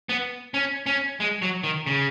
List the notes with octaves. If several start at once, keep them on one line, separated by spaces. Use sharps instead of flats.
B3
C#4
C#4
G#3
F#3
D#3
C#3